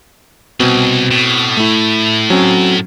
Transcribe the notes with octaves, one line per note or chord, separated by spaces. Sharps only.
C2 B2 C4
A2
A3 E4
F#3 C4 C#4